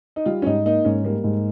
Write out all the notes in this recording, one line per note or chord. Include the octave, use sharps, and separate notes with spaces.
D#4
G3 F4
C#4
G#2 D#4
A#3 D#4
G#2 C#4
G3 A#3
G#2